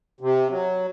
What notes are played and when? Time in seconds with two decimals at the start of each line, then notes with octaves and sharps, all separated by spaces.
0.21 C3
0.50 F#3